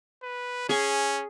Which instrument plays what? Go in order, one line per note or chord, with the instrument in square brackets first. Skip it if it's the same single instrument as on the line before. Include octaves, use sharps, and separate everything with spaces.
[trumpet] B4
[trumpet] C#4 [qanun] G#4 G#5